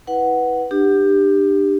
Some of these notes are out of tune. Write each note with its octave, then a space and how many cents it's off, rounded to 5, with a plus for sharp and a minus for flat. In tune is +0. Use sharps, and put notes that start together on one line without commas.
E4 -30 B4 +0 F#5 +5
D4 +30 G4 +10